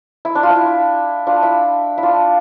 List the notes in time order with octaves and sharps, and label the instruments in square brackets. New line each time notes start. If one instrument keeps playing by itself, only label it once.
[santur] E4
D4
F4
E4
D4 F4
E4
E4
D4 F4